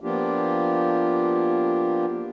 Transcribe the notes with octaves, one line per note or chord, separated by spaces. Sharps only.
F3 A#3 B3 D4 F4 G4